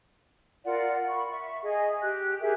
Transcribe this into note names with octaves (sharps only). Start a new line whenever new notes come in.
F4 A#4 D5 F#5
B5 C#6
E5 C#6
G#4 D#5
G4 F#6
G4 G#4 A#4 E5